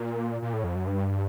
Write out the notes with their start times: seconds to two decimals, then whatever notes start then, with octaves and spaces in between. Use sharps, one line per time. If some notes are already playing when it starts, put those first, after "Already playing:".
Already playing: A#2
0.42 A#2
0.53 A2
0.64 F2
0.75 F#2
0.87 G2